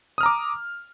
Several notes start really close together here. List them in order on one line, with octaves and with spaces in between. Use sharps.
D#6 F6 A#5 D6